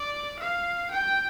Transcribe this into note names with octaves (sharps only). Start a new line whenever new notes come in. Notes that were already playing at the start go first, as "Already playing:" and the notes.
Already playing: D5
F5
G5